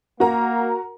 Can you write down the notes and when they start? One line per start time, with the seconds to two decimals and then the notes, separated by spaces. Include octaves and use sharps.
0.20 A#3 F#4 A#4 A#5